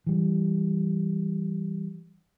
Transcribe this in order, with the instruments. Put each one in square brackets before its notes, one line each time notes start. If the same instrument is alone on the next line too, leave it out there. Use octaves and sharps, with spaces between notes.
[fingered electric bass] E3 G3